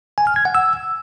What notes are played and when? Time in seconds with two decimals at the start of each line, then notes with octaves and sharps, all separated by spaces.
0.18 G#5
0.27 F6
0.36 G#6
0.45 F#5
0.55 E6